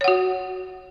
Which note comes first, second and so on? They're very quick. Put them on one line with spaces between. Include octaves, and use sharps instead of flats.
C#5 F#5 F#4